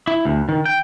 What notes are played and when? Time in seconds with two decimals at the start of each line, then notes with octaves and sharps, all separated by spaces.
0.08 E4
0.25 D2
0.49 D#3
0.65 G5